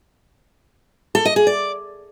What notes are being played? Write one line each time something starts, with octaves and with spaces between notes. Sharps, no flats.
A4
D#5
G#4
D5